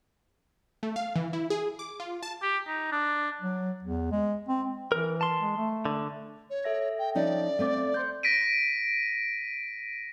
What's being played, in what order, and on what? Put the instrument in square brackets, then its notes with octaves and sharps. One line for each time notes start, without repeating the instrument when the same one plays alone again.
[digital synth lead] A3
F5
E3
E4
G#4
D6
F4
A5
[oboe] G4
D#4
D4
[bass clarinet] F#3
E2
G#3
C4
[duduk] E3 [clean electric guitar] A#4
[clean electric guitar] A5 C6
[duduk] G#3
A3
[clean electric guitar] D3
[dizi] C#5
[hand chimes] A4 E5 A#6
[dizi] G5
[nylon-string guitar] F3 C#4 D#4 [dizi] D5
[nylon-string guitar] A3 C4 [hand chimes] F5 D6
[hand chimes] C5 C6 G6
[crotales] A#6 B6 D7 D#7